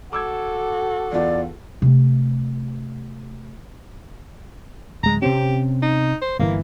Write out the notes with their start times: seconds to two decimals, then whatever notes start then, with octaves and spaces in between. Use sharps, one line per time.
0.13 F#4 A4 D6 E6 G#6
1.12 E2 F4 D5
1.82 C3 A3
5.03 D1 G#3 A#5
5.22 C3 C4 C#4 G4
5.82 D#4
6.22 C5
6.39 G1 C3 E3 A#3